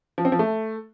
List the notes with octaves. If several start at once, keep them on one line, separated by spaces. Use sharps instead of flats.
F3
C4
F3
A3